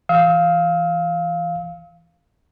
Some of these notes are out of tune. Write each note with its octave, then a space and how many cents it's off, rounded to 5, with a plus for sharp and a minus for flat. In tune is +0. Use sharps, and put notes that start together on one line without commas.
E3 +10 F5 +0 E6 -45